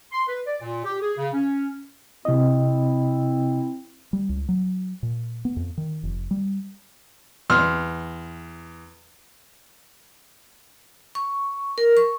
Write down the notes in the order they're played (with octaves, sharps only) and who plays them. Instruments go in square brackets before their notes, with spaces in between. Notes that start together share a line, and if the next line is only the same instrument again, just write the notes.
[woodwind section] C6
B4
D5
A#2
G4
G#4
C#3
C#4
[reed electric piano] C3 D#5 [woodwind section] C4 E4
[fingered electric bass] G3
C#2
F#3
A#2
B3
F2
D#3
F1
G3
[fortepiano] E2 C6 F6
[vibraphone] C#6
A#4
C#6